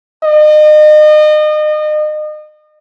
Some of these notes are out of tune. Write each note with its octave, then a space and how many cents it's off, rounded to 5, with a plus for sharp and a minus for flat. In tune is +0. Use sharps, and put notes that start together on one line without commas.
D#5 -35